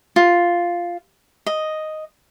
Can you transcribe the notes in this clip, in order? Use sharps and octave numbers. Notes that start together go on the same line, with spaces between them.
F4
D#5